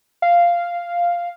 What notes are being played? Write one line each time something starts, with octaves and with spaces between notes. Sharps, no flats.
F5